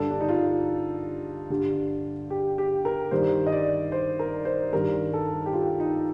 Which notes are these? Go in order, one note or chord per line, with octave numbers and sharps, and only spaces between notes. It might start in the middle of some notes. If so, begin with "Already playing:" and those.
Already playing: G2 D3 G3 A4
D4
D#4
F4
G2 D3 G3
G4
G4
A#4
G2 D#3 G3 C5
D#5
D5
C5
A#4
C5
G2 D#3 G3 A#4
A4
G4
F4
D#4